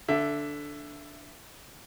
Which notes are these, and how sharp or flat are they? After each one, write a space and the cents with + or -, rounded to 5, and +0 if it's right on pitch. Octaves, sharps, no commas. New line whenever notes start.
D3 -5 E5 +15